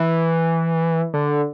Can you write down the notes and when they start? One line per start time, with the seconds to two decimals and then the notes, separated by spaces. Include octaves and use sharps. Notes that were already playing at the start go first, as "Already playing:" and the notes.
Already playing: E3
1.14 D3